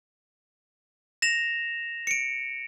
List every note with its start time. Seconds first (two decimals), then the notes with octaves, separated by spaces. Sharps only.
1.22 A#6 E7 F7
2.07 C#7 D7